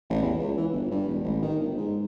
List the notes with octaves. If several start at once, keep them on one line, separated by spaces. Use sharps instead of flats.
A1
E2
C#2
E3
G1
G2
E1
A1
D#3
G1
G#2